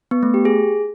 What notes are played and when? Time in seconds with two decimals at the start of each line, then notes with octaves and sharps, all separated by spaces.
0.11 B3
0.23 A3
0.34 G4
0.45 G#4